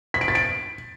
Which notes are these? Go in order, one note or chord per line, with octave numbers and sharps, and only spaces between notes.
B6
D7
A6
D7